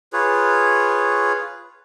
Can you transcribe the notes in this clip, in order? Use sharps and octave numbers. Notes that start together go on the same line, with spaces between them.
F4 G#4 B4 C#5